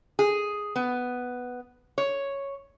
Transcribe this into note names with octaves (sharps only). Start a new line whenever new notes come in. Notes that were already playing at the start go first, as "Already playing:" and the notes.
G#4
B3
C#5